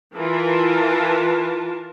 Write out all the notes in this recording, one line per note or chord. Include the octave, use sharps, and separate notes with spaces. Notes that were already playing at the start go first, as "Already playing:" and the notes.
E3 F4 A#4 A5